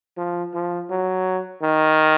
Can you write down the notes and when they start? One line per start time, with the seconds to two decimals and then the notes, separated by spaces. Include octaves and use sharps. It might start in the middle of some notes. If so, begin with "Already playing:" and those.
0.18 F3
0.54 F3
0.90 F#3
1.63 D#3